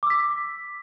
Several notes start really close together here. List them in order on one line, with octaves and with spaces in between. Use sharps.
D6 E6 B6